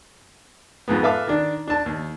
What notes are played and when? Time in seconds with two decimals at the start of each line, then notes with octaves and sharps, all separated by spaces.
0.88 F2 G#2 B3
1.03 A4 B4 E5 F5 D6
1.27 D#3 D4
1.68 D4 A5
1.86 D#2